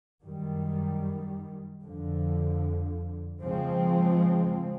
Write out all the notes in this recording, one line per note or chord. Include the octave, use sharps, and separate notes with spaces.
F#2 D#3 G3
F2 D3 F3
C#3 F3 G#3 C4